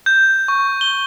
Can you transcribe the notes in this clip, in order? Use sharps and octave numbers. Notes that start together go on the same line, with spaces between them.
G6
C#6
G7